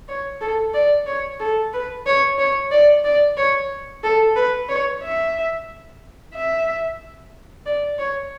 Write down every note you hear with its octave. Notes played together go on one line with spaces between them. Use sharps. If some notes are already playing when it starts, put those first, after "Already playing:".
C#5
A4
D5
C#5
A4
B4
C#5
C#5
D5
D5
C#5
A4
B4
C#5
E5
E5
D5
C#5